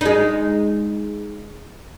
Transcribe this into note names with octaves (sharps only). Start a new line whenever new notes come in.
G#3 D#4